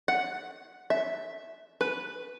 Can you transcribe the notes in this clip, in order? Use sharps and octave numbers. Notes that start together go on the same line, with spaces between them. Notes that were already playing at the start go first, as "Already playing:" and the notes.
F#5
E5
B4